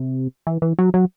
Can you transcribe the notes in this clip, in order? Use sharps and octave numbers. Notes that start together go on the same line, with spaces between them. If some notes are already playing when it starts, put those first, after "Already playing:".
Already playing: C3
E3
E3
F#3
F#3